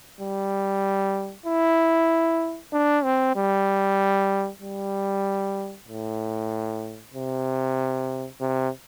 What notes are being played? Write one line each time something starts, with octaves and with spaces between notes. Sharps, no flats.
G3
E4
D4
C4
G3
G3
A2
C3
C3